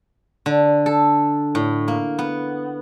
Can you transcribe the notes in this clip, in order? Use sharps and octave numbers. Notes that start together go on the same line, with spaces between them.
D3
A4
A2
A#3
B3